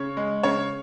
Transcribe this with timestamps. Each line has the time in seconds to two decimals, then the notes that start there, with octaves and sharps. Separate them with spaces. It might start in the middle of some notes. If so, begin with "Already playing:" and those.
Already playing: C#3 C#5
0.17 G#3
0.43 C#3 C#5